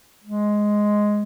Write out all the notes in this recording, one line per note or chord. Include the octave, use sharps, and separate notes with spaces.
G#3